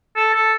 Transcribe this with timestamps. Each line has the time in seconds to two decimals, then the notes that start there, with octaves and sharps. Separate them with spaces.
0.16 A4
0.34 A4